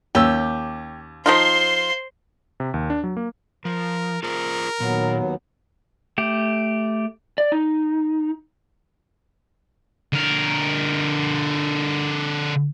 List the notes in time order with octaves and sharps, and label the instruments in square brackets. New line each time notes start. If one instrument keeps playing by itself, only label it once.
[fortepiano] D#2 C#4 E6 [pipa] G4
[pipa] F3 D#4 F4 [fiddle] C5 C6
[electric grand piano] C3
D#2
D4
F#3
A#3
[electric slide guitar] F3 [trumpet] A#4
[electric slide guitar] F4 G#4 C5 [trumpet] A#4
[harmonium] D#2 F#3 B3 [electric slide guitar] A#2
[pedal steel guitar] A3 G4
[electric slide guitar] D5
D#4
[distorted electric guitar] D3 A#4